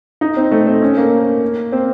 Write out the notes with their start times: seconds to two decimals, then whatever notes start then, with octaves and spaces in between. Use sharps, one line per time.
0.21 D#4
0.37 C4
0.51 A3
0.67 C4
0.82 C#4
0.97 A#3
1.72 C4